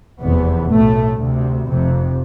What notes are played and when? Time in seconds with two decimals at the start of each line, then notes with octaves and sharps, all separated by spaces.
0.22 F1 E2 C3 B3
0.70 B1 A2 A3
1.18 D2 C3
1.67 F1 F2 C3